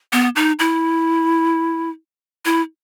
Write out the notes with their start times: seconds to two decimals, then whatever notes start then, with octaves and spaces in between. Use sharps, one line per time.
0.13 B3
0.36 D#4
0.59 E4
2.45 E4